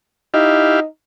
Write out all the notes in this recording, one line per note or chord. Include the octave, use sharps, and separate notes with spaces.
D#4 E4 G4 F5